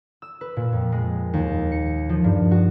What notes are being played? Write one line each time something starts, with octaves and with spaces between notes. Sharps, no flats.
E6
B4
A#2
F2
G#3
D#2
C#7
F3
G2
F#4